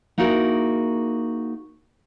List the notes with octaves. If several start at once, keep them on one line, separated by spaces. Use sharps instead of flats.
A#3 D#4 E4 F#4 G#4 A#4